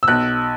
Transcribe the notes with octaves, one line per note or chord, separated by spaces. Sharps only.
E6
B1 F#6